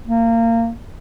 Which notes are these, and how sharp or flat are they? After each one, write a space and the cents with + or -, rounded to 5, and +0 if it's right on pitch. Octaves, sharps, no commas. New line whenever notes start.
A#3 -25